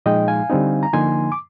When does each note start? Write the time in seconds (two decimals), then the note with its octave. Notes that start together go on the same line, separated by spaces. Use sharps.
0.06 A#2 F3 G#3 D#4 D#5 G5
0.28 F5 G#5
0.50 D3 G3 C4 D#4
0.83 A#5
0.93 D3 F3 A#3 D#4 G#5 C6
1.32 D6